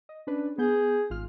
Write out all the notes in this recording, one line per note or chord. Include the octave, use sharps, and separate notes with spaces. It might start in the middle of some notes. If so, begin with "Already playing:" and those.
D#5
C#4 D4 B4
B3 G#4 G6
G#1 F4 F6